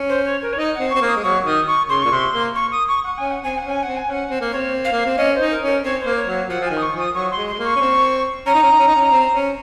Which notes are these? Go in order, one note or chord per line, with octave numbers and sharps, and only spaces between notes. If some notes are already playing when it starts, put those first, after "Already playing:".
Already playing: C#4
C5
C#5
A#4
C#5
D#4 D#5
C4 F#5
C4 C#6
A#3
D#6
G#3
F#3 C#6
D#3 D#6
C#6
C#3 C6
A#2 C#6
C3 C6
A#3
C#6
D#6
C#6
F#5
C#4 G#5
F#5
C4 G#5
F#5
C#4 G#5
C4 F#5
G#5
C#4 F#5
C4
A#3
C4 C#5
F5
A#3
C4
C#4 D#5
C5
D#4
A#4
C#4 A#4
C4 C#5
C5
A#3
C#5
F#3
F3 F#5
F3
D#3 G#5
D#6
C#6
F3 D#6
F#3 C#6
C6
G#3
C6
G#3
A#3
C#6
C#4
C4
C#4 A#5
D#4
C#4
D#4
C#4
D#4
C#4
C4
C#4